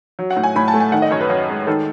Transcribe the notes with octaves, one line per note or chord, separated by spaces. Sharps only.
F#3
F#5
A2
G#5
A2 B5
A5
A3
G#5
D#3 F#5
D#5
F#2 C#5
B4
F#2
G#3
D#3 A4